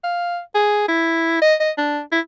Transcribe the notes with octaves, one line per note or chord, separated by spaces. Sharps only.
F5
G#4
E4
D#5
D#5
D4
E4